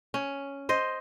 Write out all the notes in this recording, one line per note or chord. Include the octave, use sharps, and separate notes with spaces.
C#4
C5 D#5